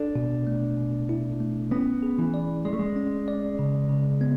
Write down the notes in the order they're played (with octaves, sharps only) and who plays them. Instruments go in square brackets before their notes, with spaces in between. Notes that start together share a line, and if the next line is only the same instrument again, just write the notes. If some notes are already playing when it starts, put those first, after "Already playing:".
Already playing: [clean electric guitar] D4 [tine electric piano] A4
[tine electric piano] B2
A3
B2
E4
A3
[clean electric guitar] B3 [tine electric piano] C#4
[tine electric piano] G#4
[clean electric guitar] E3
[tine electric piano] D5
[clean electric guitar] G#3 [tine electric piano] D5
[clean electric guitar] A3
G#3
[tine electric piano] C#4
D5
C#3
C#3
B3